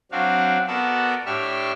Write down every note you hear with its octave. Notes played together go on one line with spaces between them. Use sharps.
F#3 C4 D4 F#4 F5
B3 F#4 A4 A#4 D5 A5
A2 D4 G4 E5 C#6 F6